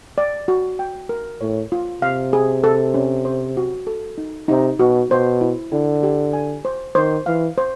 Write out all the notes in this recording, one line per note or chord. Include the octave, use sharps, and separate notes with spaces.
D5
F#4
G5
A#4
A2 C#5
F4
C3 F5
G#4
A4
C#4
C5
F#4
A4
D#4
C3 D#4
B2 F#4
B2 C5
E4
D3 E4
G4
G#5
C5
D#3 C5
E3 F5
C5